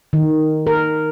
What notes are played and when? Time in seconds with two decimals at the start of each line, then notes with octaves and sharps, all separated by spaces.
0.13 D#3
0.67 A#4